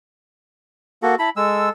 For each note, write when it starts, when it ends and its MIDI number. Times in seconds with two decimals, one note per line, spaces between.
1.02 1.16 58
1.02 1.16 66
1.02 1.16 69
1.02 1.15 78
1.19 1.30 64
1.19 1.30 81
1.19 1.30 83
1.36 1.69 56
1.36 1.70 69
1.36 1.69 88